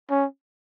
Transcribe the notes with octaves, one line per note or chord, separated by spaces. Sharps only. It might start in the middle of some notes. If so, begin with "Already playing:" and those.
C#4